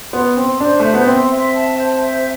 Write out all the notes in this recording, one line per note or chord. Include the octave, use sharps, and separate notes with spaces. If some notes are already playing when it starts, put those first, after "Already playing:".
B3 C6
C4 C6
D4 C5
A3 E5
B3
C4 C6
E5
A5
C5
E5